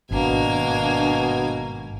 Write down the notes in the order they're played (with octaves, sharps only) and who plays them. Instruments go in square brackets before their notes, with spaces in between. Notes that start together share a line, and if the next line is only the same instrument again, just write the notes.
[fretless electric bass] G#1 [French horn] B2 [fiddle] A#3 G#5 [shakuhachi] D4